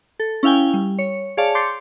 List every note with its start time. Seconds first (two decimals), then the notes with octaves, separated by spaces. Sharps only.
0.20 A4
0.43 C#4 E4 F5 G5 G#5
0.74 G3
0.99 C#5
1.37 G#4 C#5 D5 F5 A5
1.55 C6 D6 G6 A6 C7 C#7